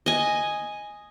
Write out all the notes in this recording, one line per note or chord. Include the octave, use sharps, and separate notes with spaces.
D#5 G#5